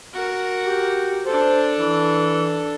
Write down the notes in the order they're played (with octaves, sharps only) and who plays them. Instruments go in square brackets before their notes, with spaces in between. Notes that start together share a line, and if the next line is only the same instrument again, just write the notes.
[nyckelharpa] F#4 A#4
[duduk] G4
[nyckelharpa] D4 A4 [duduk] C5
[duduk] E3